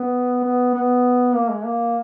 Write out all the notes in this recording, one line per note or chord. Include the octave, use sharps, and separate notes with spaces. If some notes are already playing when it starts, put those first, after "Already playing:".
Already playing: B3
B3
B3
A#3
G#3
A#3